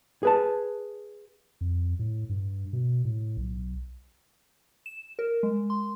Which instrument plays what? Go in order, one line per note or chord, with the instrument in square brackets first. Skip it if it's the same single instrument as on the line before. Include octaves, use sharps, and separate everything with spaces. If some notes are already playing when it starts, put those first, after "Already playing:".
[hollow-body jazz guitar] G#4 B4 A5
[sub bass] F2
A2
G2
B2
A2
B1
[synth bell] E7
A#4
G#3
C6